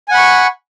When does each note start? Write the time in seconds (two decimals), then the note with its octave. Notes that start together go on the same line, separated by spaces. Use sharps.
0.08 G#5
0.11 F#5
0.14 B5
0.17 C#6